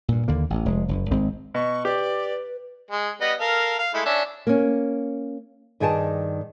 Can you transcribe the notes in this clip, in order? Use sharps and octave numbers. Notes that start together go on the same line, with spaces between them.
G2 A#2
D#2 D3 A#3
A1
F1 G#3
F#1
G#1 G#3 C4
B2 C#6
G4 B4 D5
G#3
G3 B3 D#5
A4 A#4 F5
F5
G#3 A3 E4
C#4 D4 E5
A#3 C#4
G2 D#3 G#4 D5 G5 A5